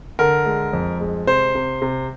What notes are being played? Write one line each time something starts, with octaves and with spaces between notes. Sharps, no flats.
D3 A#4
G#3
F2
G#3
C3 C5
C3
C3